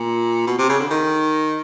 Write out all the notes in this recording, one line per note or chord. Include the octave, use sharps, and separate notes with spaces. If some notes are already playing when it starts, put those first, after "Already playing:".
Already playing: A#2
B2
C3
C#3
D3
D#3